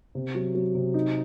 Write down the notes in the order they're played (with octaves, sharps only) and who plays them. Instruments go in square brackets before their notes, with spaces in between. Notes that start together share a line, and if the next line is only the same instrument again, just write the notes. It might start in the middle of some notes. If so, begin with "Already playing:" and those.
[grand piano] C3
F#3
F#3
C3
D#4